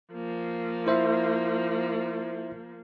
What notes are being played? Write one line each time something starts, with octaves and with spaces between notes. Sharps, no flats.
F3 A#3
E4 C5 E5